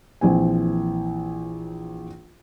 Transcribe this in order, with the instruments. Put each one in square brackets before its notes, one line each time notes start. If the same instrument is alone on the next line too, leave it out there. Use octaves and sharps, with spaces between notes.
[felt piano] A#1 E3 C4 G#5